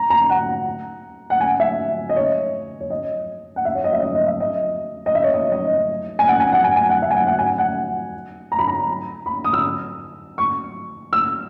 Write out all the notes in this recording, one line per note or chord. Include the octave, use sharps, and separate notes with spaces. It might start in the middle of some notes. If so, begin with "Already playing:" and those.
Already playing: A#5
A#5
F#5
F#5
G#5
E5
D#5
C#5
C#5
D#5
F#5
E5
C#5
D#5
E5
D#5
D#5
E5
D#5
D#5
E5
C#5
D#5
D#5
G#5
F#5
G#5
F#5
G#5
G#5
F#5
E5
G#5
F#5
F#5
G#5
F#5
A#5
B5
A#5
B5
D#6
E6
C#6
E6